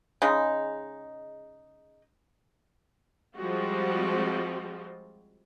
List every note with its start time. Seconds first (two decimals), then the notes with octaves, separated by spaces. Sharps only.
0.22 C#3 G#3 D#4
3.38 F3 G3 G#3 C4 F4 F#4